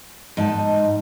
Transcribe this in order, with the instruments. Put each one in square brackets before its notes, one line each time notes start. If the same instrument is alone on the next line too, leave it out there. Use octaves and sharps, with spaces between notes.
[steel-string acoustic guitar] G#2 D#4 A5